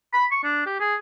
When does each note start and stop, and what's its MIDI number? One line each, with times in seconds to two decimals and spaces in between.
0.13 0.25 83
0.31 0.41 85
0.43 0.62 62
0.66 0.77 67
0.80 0.95 68